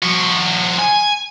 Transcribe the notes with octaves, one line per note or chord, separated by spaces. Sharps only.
F3 F#4
G#5